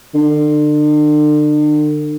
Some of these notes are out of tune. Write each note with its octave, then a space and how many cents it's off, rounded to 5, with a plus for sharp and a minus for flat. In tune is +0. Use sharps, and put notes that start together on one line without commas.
D3 +40